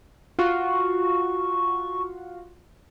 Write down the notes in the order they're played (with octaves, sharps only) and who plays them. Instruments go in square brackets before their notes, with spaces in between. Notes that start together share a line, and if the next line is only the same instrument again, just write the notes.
[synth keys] F4 F#4 [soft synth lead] C#6